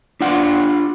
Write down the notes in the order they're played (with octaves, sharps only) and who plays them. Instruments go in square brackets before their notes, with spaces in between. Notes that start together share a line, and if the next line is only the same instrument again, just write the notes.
[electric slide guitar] D4 F4 F#5